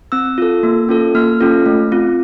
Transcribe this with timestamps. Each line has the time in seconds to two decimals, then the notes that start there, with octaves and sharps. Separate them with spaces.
0.12 C4 E6
0.38 F4 A4
0.63 A#3
0.89 C#4 F4 A4
1.15 A#3 F6
1.40 C#4 F4 A4
1.66 A3
1.92 C4 F4